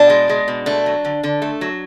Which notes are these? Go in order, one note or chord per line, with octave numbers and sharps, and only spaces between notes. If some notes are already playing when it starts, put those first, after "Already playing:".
Already playing: B2 D4
G#3
G#3
B2
A3 D4
F#3
D3
D3
A3
F#3